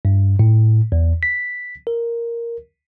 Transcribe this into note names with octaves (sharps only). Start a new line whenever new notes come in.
G2
A2
E2
B6
A#4